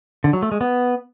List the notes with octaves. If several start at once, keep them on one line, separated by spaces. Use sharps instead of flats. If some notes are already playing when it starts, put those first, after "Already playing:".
D3
F#3
A3
G#3
B3